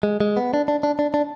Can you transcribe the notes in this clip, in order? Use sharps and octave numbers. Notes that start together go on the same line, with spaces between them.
G#3
G#3
B3
D4
D4
D4
D4
D4